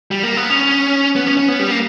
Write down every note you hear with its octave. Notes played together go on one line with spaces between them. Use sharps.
G3
A#3
B3
C#4
B3
C#4
C#4
B3
G3
A#3